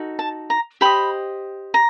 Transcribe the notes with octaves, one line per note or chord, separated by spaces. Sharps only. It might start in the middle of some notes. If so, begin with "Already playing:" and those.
Already playing: D#4 F#4 A4
A5
A#5
G4 C5 D#5 B5
A#5